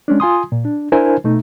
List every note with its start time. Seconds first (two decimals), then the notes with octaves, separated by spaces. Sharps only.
0.08 G#3 C#4 D4
0.20 F4 G#5 C6 D#6
0.52 A#2
0.65 D4
0.92 D4 E4 A#4 C5 G#5
1.24 B2 A3 D#4